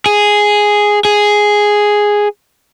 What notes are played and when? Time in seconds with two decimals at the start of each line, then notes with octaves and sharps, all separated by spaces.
0.06 G#4
1.05 G#4